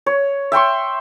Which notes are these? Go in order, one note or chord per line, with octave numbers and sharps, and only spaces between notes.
C#5
E5 G5 C6 C#6